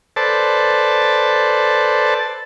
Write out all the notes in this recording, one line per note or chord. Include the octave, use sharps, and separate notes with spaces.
A4 B4 C5 D5 A5